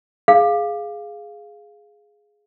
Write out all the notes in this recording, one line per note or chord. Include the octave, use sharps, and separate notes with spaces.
G#4 F5